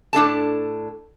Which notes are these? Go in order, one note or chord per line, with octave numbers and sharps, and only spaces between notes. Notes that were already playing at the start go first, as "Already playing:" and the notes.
A2 D4 A4 A5